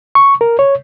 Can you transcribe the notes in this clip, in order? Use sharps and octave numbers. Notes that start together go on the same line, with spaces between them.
C#6
A#4
C#5